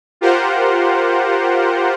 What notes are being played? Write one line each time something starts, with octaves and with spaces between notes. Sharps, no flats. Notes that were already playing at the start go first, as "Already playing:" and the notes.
F4 G4 A#4 C5 F#5